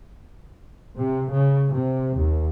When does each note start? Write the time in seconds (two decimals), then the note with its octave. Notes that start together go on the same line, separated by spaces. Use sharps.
0.98 C3
1.32 C#3
1.74 C3
2.17 D#2